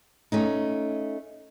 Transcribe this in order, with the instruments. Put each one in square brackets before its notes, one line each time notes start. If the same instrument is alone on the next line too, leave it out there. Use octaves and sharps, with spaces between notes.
[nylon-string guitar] A3 C#4 D#4